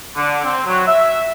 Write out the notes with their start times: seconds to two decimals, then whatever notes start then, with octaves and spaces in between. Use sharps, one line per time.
0.16 D3
0.44 C4
0.65 F#3
0.87 E5